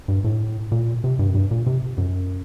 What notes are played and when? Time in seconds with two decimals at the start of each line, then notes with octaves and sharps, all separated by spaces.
0.08 G2
0.24 A2
0.72 A#2
1.04 C3
1.19 G2
1.29 F#2
1.35 G2
1.51 A#2
1.66 C3
1.98 F#2